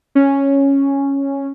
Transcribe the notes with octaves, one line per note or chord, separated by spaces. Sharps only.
C#4